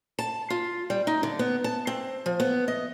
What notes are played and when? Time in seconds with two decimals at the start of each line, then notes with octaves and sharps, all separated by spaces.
0.19 A5
0.50 F4
0.90 G3
1.07 D#4
1.23 D3
1.39 B3
1.64 A5
1.87 C4
2.26 F3
2.40 B3
2.68 D#5